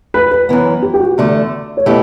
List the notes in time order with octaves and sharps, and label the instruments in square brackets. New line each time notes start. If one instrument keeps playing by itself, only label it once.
[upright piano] B4
B4
[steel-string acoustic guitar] F#2 E3 B3
[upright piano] G4
G4
F#4
[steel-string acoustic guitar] E2 D3 A3
[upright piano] C#5
[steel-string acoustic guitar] B2 A3 E4 G4 [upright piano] B4